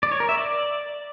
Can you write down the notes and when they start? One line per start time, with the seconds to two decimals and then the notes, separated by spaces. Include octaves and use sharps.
0.03 D5
0.12 C#5
0.20 A#4
0.29 E5
0.37 D5